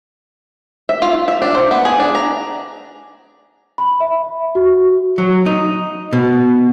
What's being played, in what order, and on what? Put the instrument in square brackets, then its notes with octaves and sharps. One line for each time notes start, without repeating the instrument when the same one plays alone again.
[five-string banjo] E5
F4
E5
D4
C5
B3
G#4
D4
A#5
[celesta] B5
E5
F#4
[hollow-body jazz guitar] F#3
D#4
B2